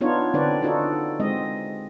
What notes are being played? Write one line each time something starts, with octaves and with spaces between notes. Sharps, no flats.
B3 D4 D#4 F4 C#5
D3 C4 D4 B4 C#5 D5
D4 D#4 F4 F#4 A4 D5
G#3 C4 D#5